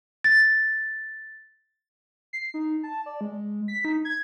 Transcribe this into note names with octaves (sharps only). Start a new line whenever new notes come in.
A6
C7
D#4
A5
D5
G#3
B6
D#4
G#6